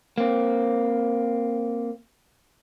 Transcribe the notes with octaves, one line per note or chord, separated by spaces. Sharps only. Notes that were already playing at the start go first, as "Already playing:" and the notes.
A#3 C4